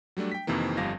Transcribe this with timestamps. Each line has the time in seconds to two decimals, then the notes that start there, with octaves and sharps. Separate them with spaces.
0.17 F#3 G3 A3 D4
0.32 G5 B6
0.47 F2 C3 D#3 E3 A#3
0.77 G1 F2 F3 G3 F5 A#6